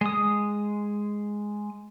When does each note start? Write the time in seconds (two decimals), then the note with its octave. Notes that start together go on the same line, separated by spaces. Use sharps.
0.01 G#3 D#6